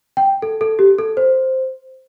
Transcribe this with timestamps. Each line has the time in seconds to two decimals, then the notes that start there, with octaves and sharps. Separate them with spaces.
0.17 G5
0.42 A4
0.61 A4
0.79 G4
0.99 A4
1.17 C5